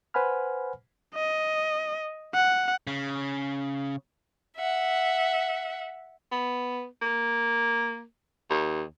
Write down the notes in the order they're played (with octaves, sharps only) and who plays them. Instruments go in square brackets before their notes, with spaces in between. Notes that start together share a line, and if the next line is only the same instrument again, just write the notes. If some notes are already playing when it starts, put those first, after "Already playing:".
[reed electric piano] B4 C5 F#5 G#5 B5 F6
[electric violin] D#5
F#5
[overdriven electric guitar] C#3
[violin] E5 F#5
[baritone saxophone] B3
A#3
D#2